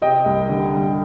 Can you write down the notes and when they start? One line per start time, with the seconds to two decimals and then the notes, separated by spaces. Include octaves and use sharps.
0.02 C3 D#5 G5
0.26 C2
0.49 D3
0.74 G2